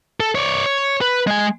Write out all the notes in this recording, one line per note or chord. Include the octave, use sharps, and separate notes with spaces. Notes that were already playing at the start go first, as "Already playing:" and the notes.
A4
C#5 D5
C#5
B4
G#3 G#5